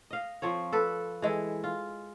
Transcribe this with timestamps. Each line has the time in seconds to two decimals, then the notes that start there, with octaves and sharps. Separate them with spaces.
0.11 D#5 F5
0.42 F3 C4 C#5
0.73 A4 B4
1.22 E3 G#3 A4
1.64 F4